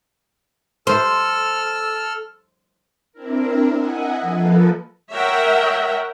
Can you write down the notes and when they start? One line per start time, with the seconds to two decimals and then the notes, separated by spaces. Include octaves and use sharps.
0.87 A4 C5 E6 F6
3.13 C4 D4 E4 A#4
3.74 D#5 E5 F#5 G#5
4.20 F3 A#3 A4 B4
5.12 A#4 C#5 E5 F#5 G5